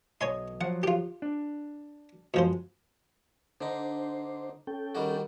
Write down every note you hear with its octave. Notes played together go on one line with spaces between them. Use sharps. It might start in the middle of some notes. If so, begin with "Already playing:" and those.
B1 C#5 D#5 G#5 C6
F3 F#3 F#5
F4 G4
D4
F#2 B2 F3 G#3 G#4 C5
D3 D4 D#4 C5
C#4 A4 G5
D#3 G3 F#4